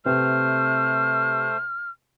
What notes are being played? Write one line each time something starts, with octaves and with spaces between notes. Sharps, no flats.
C3 A3 B4 C5 F6